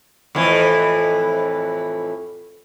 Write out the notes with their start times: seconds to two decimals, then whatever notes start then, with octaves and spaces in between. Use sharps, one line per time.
0.35 F2 A2 E3